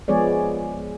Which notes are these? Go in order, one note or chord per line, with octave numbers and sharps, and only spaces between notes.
F3 G#3 B3 G#4 C#5 D5